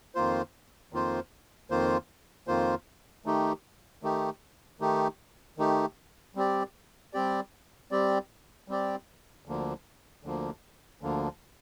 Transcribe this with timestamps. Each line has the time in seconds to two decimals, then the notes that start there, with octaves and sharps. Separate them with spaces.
0.15 F2 D#3 A#3 F4 C5
0.93 F2 D#3 A#3 F4 C5
1.70 F2 D#3 A#3 F4 C5
2.47 F2 D#3 A#3 F4 C5
3.26 D#3 A3 D#4 G4
4.03 D#3 A3 D#4 G4
4.80 D#3 A3 D#4 G4
5.58 D#3 A3 D#4 G4
6.35 G3 C4 G4 D5
7.13 G3 C4 G4 D5
7.91 G3 C4 G4 D5
8.68 G3 C4 G4 D5
9.46 D2 D3 F3 A#3
10.24 D2 D3 F3 A#3
11.01 D2 D3 F3 A#3